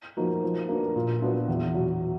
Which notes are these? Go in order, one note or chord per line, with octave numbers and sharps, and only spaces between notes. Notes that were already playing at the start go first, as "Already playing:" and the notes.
F3 A#3 D#4 F#4
F3
A#3 D4 F#4 B4
A#2
F#3 B3 D4 F4
E2
B2 F#3